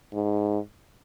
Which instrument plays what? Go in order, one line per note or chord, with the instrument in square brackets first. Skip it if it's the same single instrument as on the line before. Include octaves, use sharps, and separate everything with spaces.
[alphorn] G#2